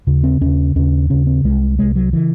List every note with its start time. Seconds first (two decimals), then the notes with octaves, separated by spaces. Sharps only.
0.07 D#2 C#3
0.23 C4
0.41 D#2 C#3 C#4
0.76 D#2 C#3 C#4
1.10 D#2 C#3 C#4
1.27 C4
1.44 C2 C3 G#3
1.78 C2 C3 G#3
1.96 F#3
2.13 C#3 E3